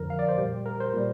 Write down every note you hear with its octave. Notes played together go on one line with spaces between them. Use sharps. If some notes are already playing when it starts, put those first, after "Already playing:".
Already playing: F2 D3 F3 A#4
F5
D5
C5
A#2 G3 G4
A#4
C5
A#2 G3